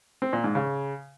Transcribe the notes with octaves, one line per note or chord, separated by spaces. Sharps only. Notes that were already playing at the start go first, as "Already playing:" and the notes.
C4
A#2
G#2
C#3